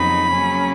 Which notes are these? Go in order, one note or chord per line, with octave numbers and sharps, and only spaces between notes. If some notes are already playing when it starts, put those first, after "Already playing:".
Already playing: F2 C#3 F#3 B3 D#4 B5
C#3 F#3 A#3 C#4